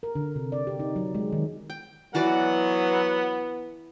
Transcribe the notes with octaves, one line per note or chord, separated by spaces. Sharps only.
A#4
D3
C3
D5
G4
D#4
F#3
G#3
D#3
G5
E3 F#3 B3 F#4 B4 D5 F#5